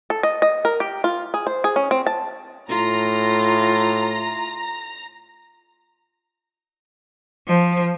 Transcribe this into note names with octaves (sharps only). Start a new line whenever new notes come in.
A4
D#5
D#5
A#4
G4
F4
G#4
C5
G#4
C#4
C4
A5
A2 F4 A#5 A#6
F3